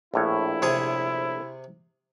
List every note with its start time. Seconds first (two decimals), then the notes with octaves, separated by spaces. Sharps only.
0.14 A#1 A2 E4 C#5
0.62 C3 G#4